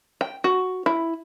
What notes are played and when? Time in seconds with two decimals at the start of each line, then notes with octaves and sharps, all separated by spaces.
0.21 G5
0.44 F#4
0.86 E4